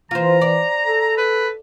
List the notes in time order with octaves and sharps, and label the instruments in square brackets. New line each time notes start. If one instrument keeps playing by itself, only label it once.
[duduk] E3 [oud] F4 C5 [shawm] A#5
[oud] D5
[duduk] A4
[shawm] B4